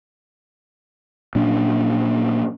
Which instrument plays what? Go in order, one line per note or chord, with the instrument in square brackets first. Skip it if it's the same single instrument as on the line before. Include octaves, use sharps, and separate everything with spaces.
[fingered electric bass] A#2 F#3 C#4 D4